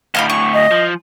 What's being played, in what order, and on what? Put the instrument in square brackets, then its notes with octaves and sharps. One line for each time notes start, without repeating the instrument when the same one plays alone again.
[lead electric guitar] D2 A2 [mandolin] D#5 F5 B5
[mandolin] C#6
[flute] D#5
[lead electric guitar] F3